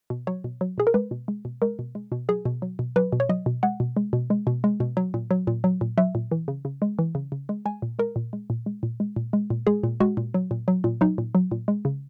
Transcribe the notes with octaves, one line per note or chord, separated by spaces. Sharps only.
B2
F#3 C#5
B2
F#3
B2 G#4
A#4
G#3 B4
B2
G#3
B2
G#3 A#4
B2
G#3
B2
F#3 G#4
B2
F#3
B2
F#3 B4
B2
C#5
F#3 D#5
B2
G#3 F#5
B2
G#3
B2
G#3
B2
G#3
B2
F#3
A#2
F#3
A#2
F#3
A#2
F#3 E5
A#2
E3
C#3
C#3
G#3
E3
C#3
C#3
G#3
G#3 G#5
A#2
G#3 A#4
A#2
G#3
A#2
G#3
A#2
G#3
A#2
G#3
A#2
G#3 G#4
A#2
G#3 F#4
A#2
F#3
A#2
F#3
A#2
F#3 D#4
A#2
F#3
A#2
G#3
C#3